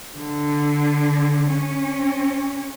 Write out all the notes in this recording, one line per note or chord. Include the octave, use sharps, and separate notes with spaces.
D3
C#4